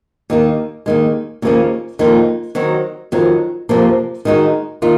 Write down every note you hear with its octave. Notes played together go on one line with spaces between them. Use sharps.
D#2 D#3 A#3
D#2 D#3 G#3
D#2 C#3 F3 A#3 C#4
F2 D#3 A#3 F4
D#3 F#3 C4 F#4
F2 D#3 F#3 C4
F2 C3 F3 A#3
D#3 G#3 D#4 F#4
D#3 A#3 F4